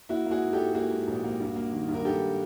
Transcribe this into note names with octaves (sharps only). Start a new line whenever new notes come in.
A#3 E4 F#4
A#3
F#4 G#4
G#2
G#2 G4 A4
A#3 F#4 G#4
G#2
A#1
A#3
G2
A#3
D#3
G2
A#4
G2 G4 A4